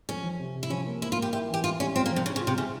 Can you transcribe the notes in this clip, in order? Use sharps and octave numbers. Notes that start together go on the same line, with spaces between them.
F2 C#4
F3
C3
C3
E4
F3 C#4
A#3
A#3 E4
F4
A#3 G4
E4 G4
E3
G4
E4 F4
G3 C#4
C4 F4
A#3
F3
C3
C#3 C#4
C#3
F4
C3
C#3 E4